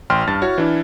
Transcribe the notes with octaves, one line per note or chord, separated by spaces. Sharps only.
A1 G5 C6 F6
G2 A5 A6
E4 F#4 C#5
E3 D4 E4